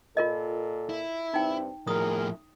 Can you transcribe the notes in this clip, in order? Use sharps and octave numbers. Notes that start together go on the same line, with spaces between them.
A#2 F4 A4 A#4 D#5
E4
G2 C4 D#4 G5
A2 F3 G#4 A#4 D#6